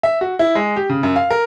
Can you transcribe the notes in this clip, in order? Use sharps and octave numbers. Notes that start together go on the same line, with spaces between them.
E5
F#4
E4
G#3
G4
C#3
F#2
F5
A#4